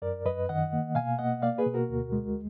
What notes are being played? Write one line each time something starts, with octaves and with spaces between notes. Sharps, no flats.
F#2 A#4 D5
F#2 B4 D#5
D#3 D#5 F#5
A#3
B2 F5 G#5
A#3 D#5 F#5
A#3 D5 F5
G#4 B4
B2
F#4 A#4
D2
G#3